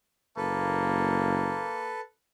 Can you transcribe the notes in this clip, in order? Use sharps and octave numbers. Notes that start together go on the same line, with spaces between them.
F#1 A#3 A4 B4